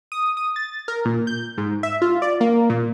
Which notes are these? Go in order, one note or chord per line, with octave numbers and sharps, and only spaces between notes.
D#6
D#6
A6
A#4
A#2
G6
G#2
E5
F4
D5
A#3
A#2